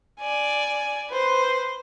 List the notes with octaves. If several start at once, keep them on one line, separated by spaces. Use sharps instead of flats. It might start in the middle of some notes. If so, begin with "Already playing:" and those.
D5 G#5
B4 C5